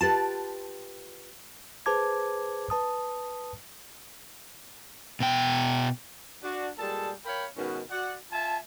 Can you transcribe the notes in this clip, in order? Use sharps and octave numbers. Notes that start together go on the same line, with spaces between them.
F4 G4 B4 A5
G#4 B4 C5 A5 D6 G#6
B4 A5 D#6
B2 G5
D4 F#4
A#2 G3 G#3 A4 A5
A#4 C#5 F5 G5 B5
G#2 B2 D#3 C#4 F#4 B4
F#4 D5 F#5
F4 E5 G#5 A5